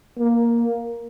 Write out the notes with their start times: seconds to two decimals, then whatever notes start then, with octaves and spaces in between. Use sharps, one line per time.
0.19 A#3